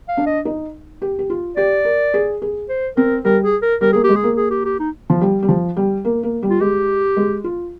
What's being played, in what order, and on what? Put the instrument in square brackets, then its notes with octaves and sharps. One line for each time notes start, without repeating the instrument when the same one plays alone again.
[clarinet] F5
[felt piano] D4
[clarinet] D#5
[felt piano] D#4
G4
G4
F4
[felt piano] G4 [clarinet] D5
[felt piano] A#4
G#4
G#4
[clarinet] C5
[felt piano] C4 [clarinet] A#4
[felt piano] G3 [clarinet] A#4
[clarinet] G#4
A#4
[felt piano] G3 [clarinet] A#4
[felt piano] A#3 [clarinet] G#4
[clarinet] G4
[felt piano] G#3
[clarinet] G#4
[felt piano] A#3
[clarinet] G#4
G4
G4
D#4
[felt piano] F3
G3
G3
F3
G3
A#3
A#3
G3
[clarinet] F4
[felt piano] G#3 [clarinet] G4
[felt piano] G#3
F4